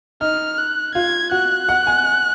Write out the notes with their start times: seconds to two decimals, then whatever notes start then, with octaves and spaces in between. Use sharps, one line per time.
0.21 D#4 F6
0.58 F#6
0.95 F4 G#6
1.31 F#4 F#6
1.69 F#5
1.87 G#5